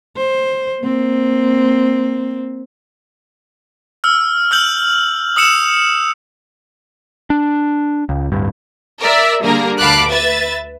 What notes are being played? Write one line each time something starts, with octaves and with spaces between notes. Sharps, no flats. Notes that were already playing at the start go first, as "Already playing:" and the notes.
C5
A#3 C4
E6 F6
E6 F6 G6 F#7
D#6 E6 C#7 E7
D4
C#2
D1 G2
A#4 D5 E5
D3 G3 A#3 G#4 A#4
D2 F5 A5 B5 D6 F#6
B4 E5 A6